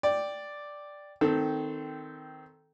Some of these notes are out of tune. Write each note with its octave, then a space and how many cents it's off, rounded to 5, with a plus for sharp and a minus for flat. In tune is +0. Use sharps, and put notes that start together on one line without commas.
D5 +0 G5 +0
D#3 +5 C4 -15 A4 +0